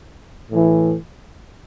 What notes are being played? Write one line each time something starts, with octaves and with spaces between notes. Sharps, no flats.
A2 E3